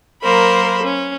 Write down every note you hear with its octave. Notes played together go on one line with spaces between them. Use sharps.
F#3 A#3 A#4 C5 B5
C#4